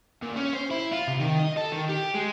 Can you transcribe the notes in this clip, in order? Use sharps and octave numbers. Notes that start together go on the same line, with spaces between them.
A#2
C#4
C5
E4
F4
C3
D#3
D#5
A4
D#3
G4
G#3